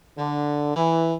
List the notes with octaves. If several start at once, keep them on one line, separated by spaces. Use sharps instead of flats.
D3
E3